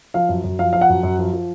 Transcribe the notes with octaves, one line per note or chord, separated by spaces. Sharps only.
F3 F5
F#2
F#2
F3 F5
F3 F5
F#5
F#2
F#2
F3
F3